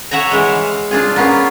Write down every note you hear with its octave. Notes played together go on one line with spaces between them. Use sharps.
C#5 E5 F#5 G#5 A#5
E3 G#3
F5
D4 F4 G#4
A#3 B3 C#4 F4